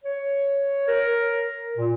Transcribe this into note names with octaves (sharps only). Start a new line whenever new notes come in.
C#5
A#4
A#2